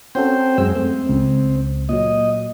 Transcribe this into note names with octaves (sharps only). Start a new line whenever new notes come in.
C4 C#4 F#4 A4 C5 G5
F#2 G#3 E6
A3 C4
C#2
A#2 F#3 D#5